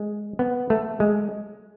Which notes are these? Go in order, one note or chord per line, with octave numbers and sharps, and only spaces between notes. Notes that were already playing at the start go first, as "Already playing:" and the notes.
Already playing: G#3
B3
A3
G#3